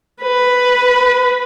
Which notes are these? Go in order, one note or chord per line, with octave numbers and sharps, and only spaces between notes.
B4